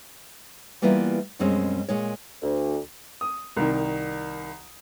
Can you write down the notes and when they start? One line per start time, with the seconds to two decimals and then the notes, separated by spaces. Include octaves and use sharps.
0.82 E3 G3 A#3 B3 E4 F4
1.39 F#2 B2 G3 G#3 C4 C#4
1.89 A#2 G#3 C#5
2.42 D2
3.21 D#6
3.57 C2 D#3